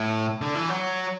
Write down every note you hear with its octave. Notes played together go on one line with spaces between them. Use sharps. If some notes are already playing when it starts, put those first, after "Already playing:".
Already playing: A2
D3
E3
F#3